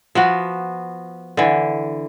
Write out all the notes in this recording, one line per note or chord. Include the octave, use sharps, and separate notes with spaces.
F3 B3 F#4
D3 E3